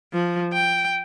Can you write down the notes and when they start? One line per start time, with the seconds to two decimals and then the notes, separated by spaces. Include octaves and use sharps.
0.13 F3
0.53 G5